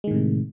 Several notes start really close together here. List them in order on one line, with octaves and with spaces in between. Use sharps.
G#3 D#3 A2 C3